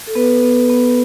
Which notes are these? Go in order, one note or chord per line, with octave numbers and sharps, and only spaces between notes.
A4
B3 B4
B3
B3